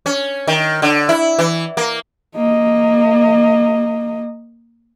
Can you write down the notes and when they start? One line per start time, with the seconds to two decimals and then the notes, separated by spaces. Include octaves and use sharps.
0.06 C#4
0.47 D#3
0.82 D3
1.09 E4
1.39 E3
1.77 A#3
2.36 A#3 D#5